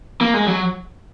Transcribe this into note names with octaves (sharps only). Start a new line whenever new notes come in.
A#3
G#3
F#3